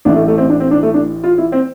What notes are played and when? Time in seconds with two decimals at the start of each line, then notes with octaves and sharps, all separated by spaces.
0.05 A1 A2 E3 D4
0.16 A3
0.28 A3
0.38 C4
0.50 D4
0.60 C4
0.71 D4
0.83 A3
0.94 D4
1.24 F4
1.38 E4
1.52 C4